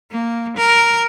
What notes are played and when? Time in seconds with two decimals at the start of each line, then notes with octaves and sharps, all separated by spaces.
0.12 A#3
0.57 A#4